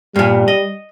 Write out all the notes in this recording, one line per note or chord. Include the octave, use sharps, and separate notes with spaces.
G2 A#2 G3
D#5